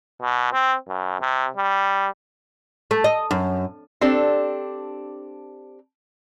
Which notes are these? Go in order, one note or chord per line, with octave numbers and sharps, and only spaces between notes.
B2
C4
F#2
C3
G3
A3
D#5
F#2
C4 D4 G4 A4